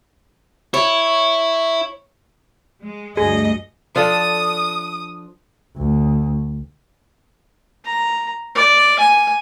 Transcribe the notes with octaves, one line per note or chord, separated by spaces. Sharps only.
E4 C#5
G#3
D2 G2 G#4 D#5
F3 D4 A4 D#6
D2
A#5
D5
G#5